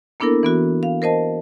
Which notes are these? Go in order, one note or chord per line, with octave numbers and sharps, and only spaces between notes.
A#3 B3 D4 E4 A4 A#4
E3 B3 F#4
F5
A#4 C5 D#5 A5